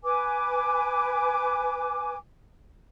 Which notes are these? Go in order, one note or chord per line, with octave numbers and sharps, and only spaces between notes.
B4 G#5 D6